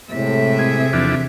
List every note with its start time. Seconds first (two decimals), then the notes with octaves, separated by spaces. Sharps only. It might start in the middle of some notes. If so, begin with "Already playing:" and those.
0.12 A2 C3 G#3 A3 E5
0.59 G#4
0.93 E2 F3 D4